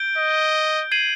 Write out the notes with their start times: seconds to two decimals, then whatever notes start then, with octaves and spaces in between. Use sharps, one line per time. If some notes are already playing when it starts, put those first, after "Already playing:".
Already playing: G6 D7 G7
0.17 D#5
0.92 G#6 C7 D#7 F#7